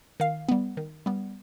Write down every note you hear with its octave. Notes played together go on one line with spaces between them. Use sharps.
D#3 F5
G3 B3
D#3
G3 B3